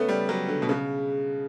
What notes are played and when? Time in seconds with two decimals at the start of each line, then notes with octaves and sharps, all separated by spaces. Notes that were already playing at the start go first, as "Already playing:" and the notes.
Already playing: A3 B3 C#4
0.08 G3
0.29 F#3
0.48 D3
0.62 B2
0.69 C#3